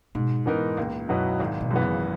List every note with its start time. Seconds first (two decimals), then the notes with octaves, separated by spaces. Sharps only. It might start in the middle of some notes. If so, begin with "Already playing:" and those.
0.15 G#2 B2
0.46 G#2 E3 B3 D#4 A#4
0.77 C#2 A#2
1.08 F#2 B2 F#3 B3 E4
1.39 G#1 G#2
1.61 B2
1.71 F#2 E3 B3
1.81 C#3